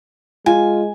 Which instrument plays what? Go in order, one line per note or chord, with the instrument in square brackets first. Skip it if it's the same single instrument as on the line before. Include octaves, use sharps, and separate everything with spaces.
[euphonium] G#3 [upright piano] F4 [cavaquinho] G#5